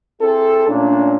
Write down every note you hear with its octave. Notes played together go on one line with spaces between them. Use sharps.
C4 E4 G#4 A4
A#2 A3 C#4 D4